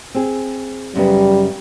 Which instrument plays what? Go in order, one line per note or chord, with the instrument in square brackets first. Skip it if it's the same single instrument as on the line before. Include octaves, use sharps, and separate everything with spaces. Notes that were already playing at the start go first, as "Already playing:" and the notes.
[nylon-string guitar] C4 G#4
[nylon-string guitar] F#2 C#3 B3 [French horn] G3